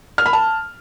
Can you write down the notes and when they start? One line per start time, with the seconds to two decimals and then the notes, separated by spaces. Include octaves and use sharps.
0.18 F6
0.26 B5
0.33 A5